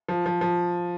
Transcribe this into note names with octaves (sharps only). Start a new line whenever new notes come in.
F3
F3
F3